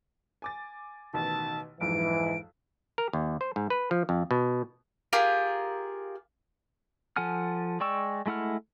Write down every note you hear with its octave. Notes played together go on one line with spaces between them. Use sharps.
G#5 D6 A6
A1 B2 D#3 A5
B1 F2 G#2 E3 D7
A#4
D#2
C5
G#2
B4
F3
F2
B2
F4 G4 G#4 A#4
F3 A4 F#5 G#5 F6
G#3 D5 G5 C#6 E6
G#3 A3 E4 F#5 F6